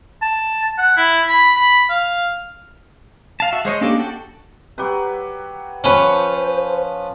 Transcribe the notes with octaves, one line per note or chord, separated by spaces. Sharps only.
A5
F#5
E4
B5
B5
F5
F5 A5
F#4 E5
G#3 C5 C#5 D#5
A#3 C#4 D4 G4 A4
F#4 A4 G5
F#3 G4 B4
F3 C#4 B4 C5 F#5 C#6